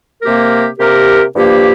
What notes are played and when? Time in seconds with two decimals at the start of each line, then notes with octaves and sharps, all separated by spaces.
0.22 C3 A#3 G4 A#4
0.78 C3 A#3 G4 A#4
1.35 G2 F3 A#3 G4